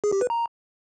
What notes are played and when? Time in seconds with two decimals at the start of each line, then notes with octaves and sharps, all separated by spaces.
0.04 G#4
0.12 G4
0.21 B4
0.30 A#5